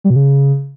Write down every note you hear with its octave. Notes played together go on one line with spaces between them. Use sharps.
G3
B2
C#3